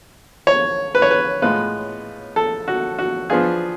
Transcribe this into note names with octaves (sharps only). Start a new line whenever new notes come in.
C#5
B4
C#5
B4
A2 G#3 B3 F4 B4
A4
F#4
F#4
F3 B3 D4 F4 G#4